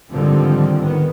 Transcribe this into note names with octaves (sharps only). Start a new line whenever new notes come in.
G#2 D3 D#3 F3 G3 C4
G#2 D#3 B3